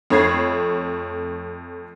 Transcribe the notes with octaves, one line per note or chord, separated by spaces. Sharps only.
F2 A3 C#5 B5 G#6 C7